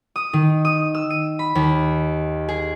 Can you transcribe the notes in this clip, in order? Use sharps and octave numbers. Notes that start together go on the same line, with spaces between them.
D#6
D#3
D#6
E6
D#7
B5
D#2
G#4